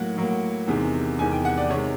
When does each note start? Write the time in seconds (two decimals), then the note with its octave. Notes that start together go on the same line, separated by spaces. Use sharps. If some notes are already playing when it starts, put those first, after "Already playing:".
Already playing: A2 F#3 A#3 F#5
0.17 A2 F#3 A#3
0.67 E2 C3 D#3 G#3
1.19 E2 C3 D#3 G#3 G#5
1.32 G5
1.45 F#5
1.57 D5
1.70 C3 C#5
1.73 D#3 G#3